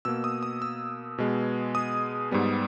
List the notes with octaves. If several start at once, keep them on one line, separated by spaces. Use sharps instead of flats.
B2 A#3 E6
D#6
D#6
E6
B2 G#3 B3
D#6
G#2 G3 B3